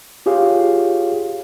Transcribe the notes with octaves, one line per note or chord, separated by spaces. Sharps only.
F4 G4 G#4 C#5 F5